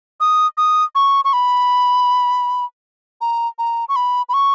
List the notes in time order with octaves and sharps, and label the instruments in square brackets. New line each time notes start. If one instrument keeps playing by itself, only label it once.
[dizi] D#6
D#6
C#6
C#6
B5
A#5
A#5
C#6
B5
B5
C#6